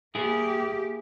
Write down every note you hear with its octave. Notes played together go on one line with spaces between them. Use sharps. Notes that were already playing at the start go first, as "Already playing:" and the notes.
A#3 E4 G4 G#4